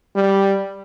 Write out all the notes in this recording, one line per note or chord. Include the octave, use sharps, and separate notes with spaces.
G3